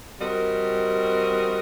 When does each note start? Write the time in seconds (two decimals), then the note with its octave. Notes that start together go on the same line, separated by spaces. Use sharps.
0.18 G3 C4 F#4 A#4 D#5